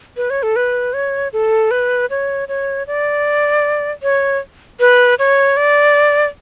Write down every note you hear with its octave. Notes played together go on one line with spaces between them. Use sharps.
B4
C#5
A4
B4
C#5
A4
B4
C#5
C#5
D5
C#5
B4
C#5
D5